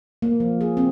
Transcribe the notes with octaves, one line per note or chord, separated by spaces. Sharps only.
A#3
F3
G#4
C4